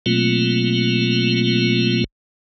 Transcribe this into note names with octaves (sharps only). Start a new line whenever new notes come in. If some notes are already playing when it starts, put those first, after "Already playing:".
B2 F#3 A3 A#3 C4 F4